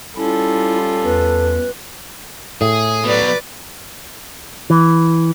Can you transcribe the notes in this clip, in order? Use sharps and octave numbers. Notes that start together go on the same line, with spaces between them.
G3 C#4 E4 F4 A4
E2 B4
A2 G#4 D#6
B2 F#3 B4 D5
E3